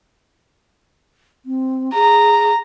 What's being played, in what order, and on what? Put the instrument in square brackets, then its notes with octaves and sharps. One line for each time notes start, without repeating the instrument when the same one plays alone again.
[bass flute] C4
[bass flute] G#4 [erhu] A#5